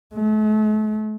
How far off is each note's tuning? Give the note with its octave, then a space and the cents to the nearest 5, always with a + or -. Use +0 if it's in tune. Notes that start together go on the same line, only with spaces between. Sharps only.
A3 -40